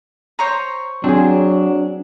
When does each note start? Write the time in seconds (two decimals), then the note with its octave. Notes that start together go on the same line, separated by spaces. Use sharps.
0.39 C5 C#5 A#5
1.04 F#3 C4 D4 G#4